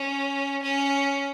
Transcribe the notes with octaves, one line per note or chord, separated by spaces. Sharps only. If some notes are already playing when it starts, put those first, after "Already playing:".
Already playing: C#4
C#4